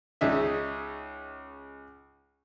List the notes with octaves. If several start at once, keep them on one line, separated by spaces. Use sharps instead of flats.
C#2 C#3 C#4 D#4 E5